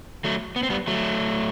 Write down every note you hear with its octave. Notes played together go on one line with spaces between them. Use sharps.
F#3 A3
B3
C4
G3 B3
F#3 A3